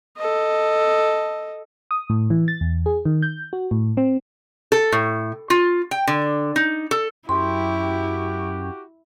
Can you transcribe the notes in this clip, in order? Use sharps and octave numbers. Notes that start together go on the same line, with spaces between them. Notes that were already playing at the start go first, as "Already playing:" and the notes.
A4 D#5
D#6
A2
E3
A6
E2
G#4
D#3
G6
F#4
A2
C4
A4
A2
F4
G5
D3
D#4
A4
F#2 E4 F#4 G4 C6